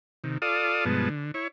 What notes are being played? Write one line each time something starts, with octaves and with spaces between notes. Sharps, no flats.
C3 D#3
F4 A4 D5 F5 D#6
G2 B2 F3 G#3 B3 A5
D3
E4 C#5